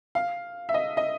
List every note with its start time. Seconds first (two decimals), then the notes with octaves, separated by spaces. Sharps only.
0.15 F5
0.69 E5
0.74 D#5
0.97 D#5